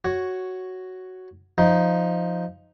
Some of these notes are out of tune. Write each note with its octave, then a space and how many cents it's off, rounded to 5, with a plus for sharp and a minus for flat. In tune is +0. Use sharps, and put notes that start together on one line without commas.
F#4 +5 C#5 +0
F3 +0 D#4 +0